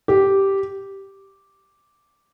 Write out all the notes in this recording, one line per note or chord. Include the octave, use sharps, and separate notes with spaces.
G4